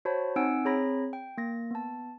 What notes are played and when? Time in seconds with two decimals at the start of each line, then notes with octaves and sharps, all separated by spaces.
0.05 F#4 C5 C#5 A5 B5
0.36 C4 D#4 F#5 G#5 E6 D7
0.65 C4 G#4 C#5 A#5 B5 A#6
1.13 G5
1.38 A#3 A#6
1.71 B3 A5